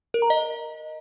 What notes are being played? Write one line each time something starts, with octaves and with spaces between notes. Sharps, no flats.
A#4
A#5
D#5